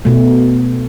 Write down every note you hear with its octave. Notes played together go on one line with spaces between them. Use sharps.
B2 A3